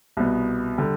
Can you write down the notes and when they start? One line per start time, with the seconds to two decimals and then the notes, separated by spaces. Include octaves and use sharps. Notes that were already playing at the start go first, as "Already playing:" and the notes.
0.17 C2 B2 B3
0.78 D3 G3